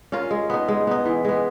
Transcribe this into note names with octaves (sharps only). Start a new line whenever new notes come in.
C#4 F4 A#4
G#3
B3 D#4
G#3
B3 D#4
E3
G#3 B3